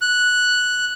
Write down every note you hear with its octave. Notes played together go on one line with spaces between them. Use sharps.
F#6